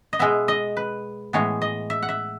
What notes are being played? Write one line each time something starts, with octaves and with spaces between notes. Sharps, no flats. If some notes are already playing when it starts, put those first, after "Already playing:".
D#5
B2 G#3 B3 E5
D#5
B4
A2 E3 G#3 B3 C#5
D#5
E5
F#5
E5